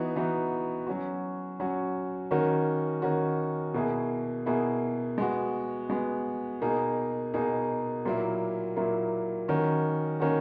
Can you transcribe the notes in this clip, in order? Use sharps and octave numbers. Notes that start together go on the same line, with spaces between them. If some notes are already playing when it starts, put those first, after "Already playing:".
Already playing: E3 B3 D#4 F#4
E3 B3 D#4 F#4
F#3 C#4 F#4
F#3 C#4 F#4
D#3 A#3 C#4 F#4
D#3 A#3 C#4 F#4
B2 A#3 E4 G#4
B2 A#3 E4 G#4
G#3 B3 F#4
G#3 B3 F#4
B2 A#3 D#4 G#4
B2 A#3 D#4 G#4
A#2 F#3 A#3 E4
A#2 F#3 A#3 E4
D#3 A#3 C#4 F#4
D#3 A#3 C#4 F#4